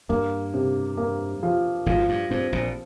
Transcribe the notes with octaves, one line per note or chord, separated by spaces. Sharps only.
G2 A#3
C3
A#3
F3
G#1 G#2 F3
G2
G2 C4
A#1 A#2